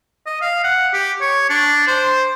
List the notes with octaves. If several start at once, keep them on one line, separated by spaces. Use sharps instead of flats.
D#5
F5
F#5
G4
C#5
D4
C5